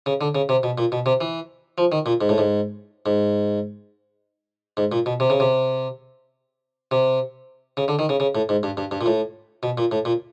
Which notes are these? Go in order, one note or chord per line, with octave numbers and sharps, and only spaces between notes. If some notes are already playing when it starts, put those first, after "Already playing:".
C#3
D3
C#3
C3
B2
A#2
B2
C3
E3
F3
D#3
A#2
G#2
A2
G#2
G#2
G#2
A#2
B2
C3
C#3
C3
C3
C#3
D3
D#3
C#3
C#3
A2
G#2
G2
G2
G2
A#2
A2
B2
A#2
A2
A#2